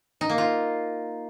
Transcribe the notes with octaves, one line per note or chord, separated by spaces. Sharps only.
D#4
A#3
F4